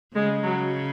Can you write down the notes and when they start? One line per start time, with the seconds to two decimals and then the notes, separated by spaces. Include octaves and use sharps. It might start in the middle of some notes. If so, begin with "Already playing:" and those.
0.15 C#3 G#3
0.43 F#3